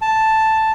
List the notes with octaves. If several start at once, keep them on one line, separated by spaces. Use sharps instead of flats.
A5